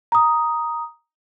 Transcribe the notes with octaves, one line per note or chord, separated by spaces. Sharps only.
A#5 D#6